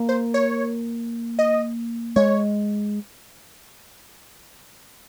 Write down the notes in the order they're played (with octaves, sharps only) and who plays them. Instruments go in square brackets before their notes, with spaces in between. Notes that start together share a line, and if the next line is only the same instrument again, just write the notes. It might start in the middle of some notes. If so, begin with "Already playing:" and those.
Already playing: [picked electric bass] A#3
[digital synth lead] C5
C#5
D#5
[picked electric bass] G#3 [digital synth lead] C#5